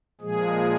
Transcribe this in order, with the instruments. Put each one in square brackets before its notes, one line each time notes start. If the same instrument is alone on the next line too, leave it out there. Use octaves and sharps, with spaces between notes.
[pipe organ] A#2 F3 G#3 G#4